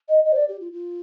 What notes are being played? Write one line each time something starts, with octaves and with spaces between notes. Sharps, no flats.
D#5
D#5
C5
D5
G4
F4
F4